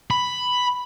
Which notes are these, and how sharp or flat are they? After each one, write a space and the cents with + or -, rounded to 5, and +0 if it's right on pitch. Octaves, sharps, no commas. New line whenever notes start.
B5 +5